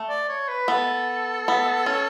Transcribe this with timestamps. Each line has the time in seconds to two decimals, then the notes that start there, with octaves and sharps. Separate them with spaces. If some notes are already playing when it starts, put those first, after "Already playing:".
Already playing: A3
0.09 D5
0.29 C#5
0.49 B4
0.68 B3 A4
1.48 B3
1.86 C#4